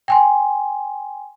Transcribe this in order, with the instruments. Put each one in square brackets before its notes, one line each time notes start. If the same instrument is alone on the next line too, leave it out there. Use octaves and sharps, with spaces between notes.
[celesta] G5 G#5 C6